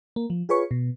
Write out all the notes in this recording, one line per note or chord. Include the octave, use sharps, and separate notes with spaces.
A#3
F3
F4 G#4 B4 C#5 C#6
B2